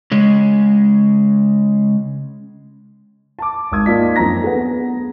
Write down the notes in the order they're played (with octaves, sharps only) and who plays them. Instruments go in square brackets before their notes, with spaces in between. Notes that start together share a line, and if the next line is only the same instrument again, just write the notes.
[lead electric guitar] C#3 G#3
[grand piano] A5 D6
G#1 A5 D#6 G#6
A#3 D#4 F4 D5 A5 B6
F#2 F3 C4 D4 A#5 A#6
A3 G#4 B4 F#5
B3